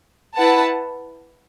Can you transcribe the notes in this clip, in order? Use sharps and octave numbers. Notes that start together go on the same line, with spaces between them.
E4 B4 F#5 A5